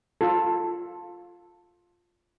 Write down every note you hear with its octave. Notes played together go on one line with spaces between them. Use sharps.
F4 A4